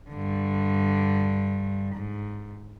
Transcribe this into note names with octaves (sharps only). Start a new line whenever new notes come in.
G2 D3
G#2